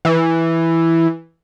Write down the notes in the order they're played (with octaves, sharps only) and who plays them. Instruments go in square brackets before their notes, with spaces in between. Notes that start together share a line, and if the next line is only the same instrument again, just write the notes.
[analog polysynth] E3